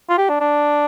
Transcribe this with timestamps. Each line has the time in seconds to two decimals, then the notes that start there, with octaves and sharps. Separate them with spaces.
0.09 F4
0.18 G4
0.29 D4
0.41 D4